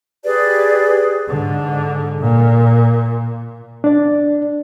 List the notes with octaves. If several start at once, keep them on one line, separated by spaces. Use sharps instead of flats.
G4 G#4 B4 D5
G#2 D3
A#2
D4 D5